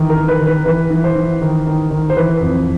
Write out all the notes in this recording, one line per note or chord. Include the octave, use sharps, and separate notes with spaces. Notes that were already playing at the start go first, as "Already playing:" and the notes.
Already playing: D#3 E3
A#4
D#3
B4
D#3
B4
E3 B4
E3
C5
E3
D#3
D#3
D#3
C5
E3 B4
F2